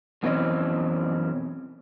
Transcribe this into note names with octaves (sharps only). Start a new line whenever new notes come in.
F#2 B2 E3 C4 C#4 D#5